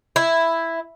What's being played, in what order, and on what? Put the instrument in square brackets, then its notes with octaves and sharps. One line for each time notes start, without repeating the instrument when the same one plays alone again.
[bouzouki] E4